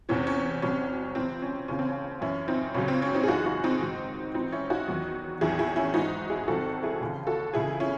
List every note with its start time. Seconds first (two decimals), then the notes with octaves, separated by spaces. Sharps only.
0.09 E2 C3 E3 C#4
0.27 C#4
0.62 C2 C3 F#3 C#4
1.15 C#2 C3 E3 C4
1.42 C#4
1.68 D#2 C#3 E3 C#4
1.79 C4
1.89 C#4
2.21 F#2 E3 C#4 E4
2.48 C4 D#4
2.74 C#2 C#3 F#3 C#4
2.88 C4
3.02 C#4
3.14 C4 D#4
3.23 G#4
3.28 F#2 E3 D#4 F#4
3.40 G#4
3.46 D#4 F#4
3.64 C4 D#4
3.81 G#2 D#3 F#3
4.34 G#2 E3 C4 D#4
4.52 C#4 E4
4.70 D#4 F#4
4.88 E2 D#3 F#3
5.41 E2 D#3 F#3 E4 G#4
5.59 E4 G#4
5.76 C#4 E4
5.94 G#2 E3 D#4 F#4
6.30 E4 G#4
6.48 C2 C3 D#3 F#3 F#4 A4
6.83 E4 G#4
7.01 D#2 C#3 E3
7.27 F#4 A4
7.54 C#2 C#3 E3 E4 G#4
7.80 C#4 E4